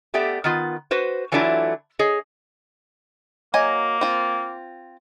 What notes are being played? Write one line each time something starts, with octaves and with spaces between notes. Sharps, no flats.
A3 B3 G4 D5 E5
D#3 B3 F4
F#4 B4 C5
E3 F#3 A3 D4 E4 F4
G#4 C#5 D#5
F#3 A#3 D#5 G#5
C4 F4